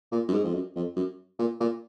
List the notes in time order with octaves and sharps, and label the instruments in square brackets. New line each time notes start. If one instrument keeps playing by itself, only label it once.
[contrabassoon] A#2
F#2
G#2
F2
F#2
F2
F#2
A#2
A#2